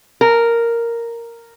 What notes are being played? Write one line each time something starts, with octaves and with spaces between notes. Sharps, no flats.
A#4